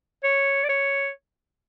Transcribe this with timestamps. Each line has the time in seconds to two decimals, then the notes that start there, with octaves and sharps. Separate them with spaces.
0.24 C#5
0.64 D5
0.69 C#5